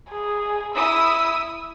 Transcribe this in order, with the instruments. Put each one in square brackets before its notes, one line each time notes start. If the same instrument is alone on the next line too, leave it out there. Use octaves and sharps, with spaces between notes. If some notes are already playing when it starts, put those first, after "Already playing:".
[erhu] G#4
[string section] E4 D#6 [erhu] E6